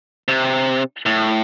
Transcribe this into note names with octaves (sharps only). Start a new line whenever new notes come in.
C3
A2